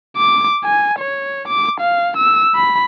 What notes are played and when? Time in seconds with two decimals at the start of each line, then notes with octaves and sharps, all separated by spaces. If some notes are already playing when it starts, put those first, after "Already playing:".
0.17 D6
0.65 G#5
0.99 C#5
1.48 D6
1.80 F5
2.17 E6
2.55 B5